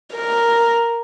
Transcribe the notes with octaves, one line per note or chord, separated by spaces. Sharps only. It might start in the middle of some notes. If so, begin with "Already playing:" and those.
A#4